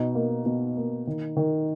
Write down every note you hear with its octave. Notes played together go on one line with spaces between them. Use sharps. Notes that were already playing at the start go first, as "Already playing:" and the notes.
Already playing: B2 D#4
A#3
B2
A#3
D#3
D#3